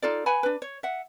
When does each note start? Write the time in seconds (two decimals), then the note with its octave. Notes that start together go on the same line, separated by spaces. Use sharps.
0.02 D#4 F4 A4 D5
0.26 B4 F#5 G#5 B5
0.43 D4 B4
0.62 C#5
0.83 E5 F#5